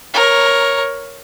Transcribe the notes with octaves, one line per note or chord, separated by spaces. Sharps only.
A#4 C#5